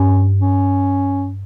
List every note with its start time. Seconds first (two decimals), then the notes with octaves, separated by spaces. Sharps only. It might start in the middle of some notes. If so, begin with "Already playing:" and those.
Already playing: G2 C#4
0.41 C#4